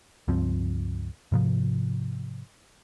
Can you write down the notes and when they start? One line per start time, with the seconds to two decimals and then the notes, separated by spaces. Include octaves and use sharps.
0.28 C#2 G2 F3 C4
1.32 G#2 C3 F3